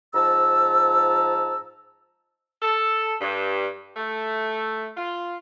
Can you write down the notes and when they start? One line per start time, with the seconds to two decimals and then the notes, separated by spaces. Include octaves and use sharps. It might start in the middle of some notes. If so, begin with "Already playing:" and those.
0.14 G#2 F3 A5 A#5 E6
2.62 A4
3.21 G2
3.97 A3
4.97 F4